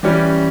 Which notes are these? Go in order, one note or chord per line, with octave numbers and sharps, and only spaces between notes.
E3 G3 C#4 G4